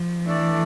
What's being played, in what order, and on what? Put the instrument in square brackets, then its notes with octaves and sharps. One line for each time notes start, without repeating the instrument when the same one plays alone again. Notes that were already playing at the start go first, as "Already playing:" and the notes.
Already playing: [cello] F3
[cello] E3 [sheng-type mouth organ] A3 D4 A4 D5